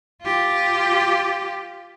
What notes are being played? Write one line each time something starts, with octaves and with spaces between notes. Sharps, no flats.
F4 G4